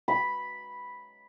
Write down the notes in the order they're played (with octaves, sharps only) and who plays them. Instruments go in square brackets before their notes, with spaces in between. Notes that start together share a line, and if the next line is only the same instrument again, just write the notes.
[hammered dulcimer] B5